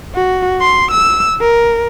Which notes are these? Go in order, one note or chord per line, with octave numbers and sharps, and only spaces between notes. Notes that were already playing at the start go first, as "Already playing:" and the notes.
F#4
C6
E6
A#4